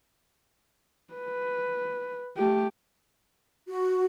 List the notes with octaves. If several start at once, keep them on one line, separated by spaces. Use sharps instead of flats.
B4
A3 G4
F#4